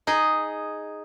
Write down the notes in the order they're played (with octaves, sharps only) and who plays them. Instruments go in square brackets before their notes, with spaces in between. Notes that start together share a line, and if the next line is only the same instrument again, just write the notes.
[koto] D#4 G#4 D#5